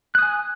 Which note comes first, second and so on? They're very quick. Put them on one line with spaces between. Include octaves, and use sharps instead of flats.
F#6 D#6 G#5